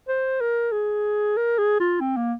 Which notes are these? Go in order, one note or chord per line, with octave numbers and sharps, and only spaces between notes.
C5
A#4
G#4
A#4
G#4
F4
C4
A#3